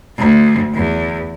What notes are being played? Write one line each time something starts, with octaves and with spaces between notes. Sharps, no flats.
D2
E2